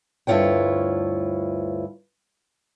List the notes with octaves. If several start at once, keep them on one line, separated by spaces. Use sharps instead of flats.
D2 G2 E4 F4 C#5 G5